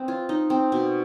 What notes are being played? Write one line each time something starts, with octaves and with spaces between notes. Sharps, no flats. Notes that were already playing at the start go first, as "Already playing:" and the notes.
Already playing: C4 B4 D#5
F4
D#4
C4
B2